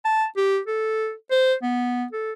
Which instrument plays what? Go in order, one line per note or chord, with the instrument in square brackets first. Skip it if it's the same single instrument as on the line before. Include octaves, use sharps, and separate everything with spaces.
[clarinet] A5
G4
A4
C5
B3
A4